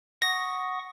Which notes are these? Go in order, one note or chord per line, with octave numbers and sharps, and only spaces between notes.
F#5 C#6 D#6 A#6